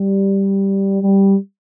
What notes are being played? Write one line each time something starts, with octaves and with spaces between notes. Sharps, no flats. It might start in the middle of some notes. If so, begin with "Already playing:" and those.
Already playing: G3
G3